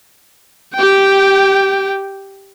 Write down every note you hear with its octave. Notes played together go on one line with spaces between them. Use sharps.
G4 G5